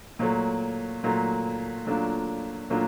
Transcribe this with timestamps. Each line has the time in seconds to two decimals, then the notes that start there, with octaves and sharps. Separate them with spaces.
0.19 A#2 F#3 A3
1.04 A#2 F#3 A3
1.87 A#2 F#3 A3 D4 F4
2.70 A#2 F#3 A3 D4 F4